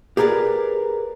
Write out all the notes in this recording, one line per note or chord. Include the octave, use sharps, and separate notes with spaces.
G4 G#4 A#4 B4 D5